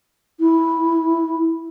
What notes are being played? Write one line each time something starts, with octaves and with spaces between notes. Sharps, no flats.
E4